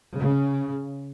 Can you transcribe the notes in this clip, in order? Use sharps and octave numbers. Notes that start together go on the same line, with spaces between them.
C#3